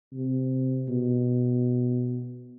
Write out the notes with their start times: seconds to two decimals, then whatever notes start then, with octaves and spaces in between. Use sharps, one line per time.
0.13 C3
0.89 B2